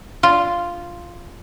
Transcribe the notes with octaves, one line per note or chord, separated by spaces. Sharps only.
F4